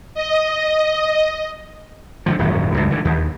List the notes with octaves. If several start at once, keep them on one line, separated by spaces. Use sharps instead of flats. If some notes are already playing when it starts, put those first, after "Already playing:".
D#5
D3 D#3 F3
D#1 G#1 F#2 F#3
C#2 G2
D3 E3
D#2